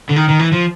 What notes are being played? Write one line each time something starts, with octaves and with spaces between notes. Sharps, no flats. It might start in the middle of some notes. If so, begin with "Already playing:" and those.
D3
D#3
D#3
E3
F3